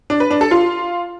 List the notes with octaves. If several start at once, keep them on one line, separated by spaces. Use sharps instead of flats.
D4
B4
D4
A4
F4